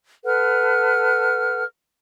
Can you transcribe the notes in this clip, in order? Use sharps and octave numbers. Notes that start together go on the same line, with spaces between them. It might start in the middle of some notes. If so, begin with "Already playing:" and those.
A4 B4 F#5 F6